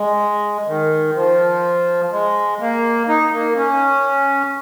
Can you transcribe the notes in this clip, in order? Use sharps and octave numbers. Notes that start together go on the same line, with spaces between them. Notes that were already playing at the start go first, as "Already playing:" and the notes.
Already playing: G#3
D#3
F3
G#3
A#3
D#4
A#3
C#4